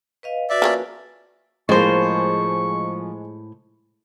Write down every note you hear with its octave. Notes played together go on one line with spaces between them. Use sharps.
B4 D#5 F5
F#4 B4 D5 E5
F3 A#3 C#4
A2 F3 G#3 A#3 C5 C#6